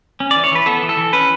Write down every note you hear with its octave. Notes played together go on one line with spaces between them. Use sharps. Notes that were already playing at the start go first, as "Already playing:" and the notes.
C#4
E3 D5
C#5
E3 B4
B3 A4
E3
A4
E3
C#4 B4